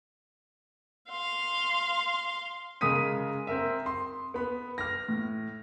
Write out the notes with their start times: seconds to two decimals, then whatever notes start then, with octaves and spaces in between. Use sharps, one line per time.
1.10 F5 C6
2.81 C#3 G#3 A#4 D#6 B6 D#7
3.47 C4 A#4 E5
3.86 C6
4.34 B3 B5
4.78 F6 A#6
5.09 A2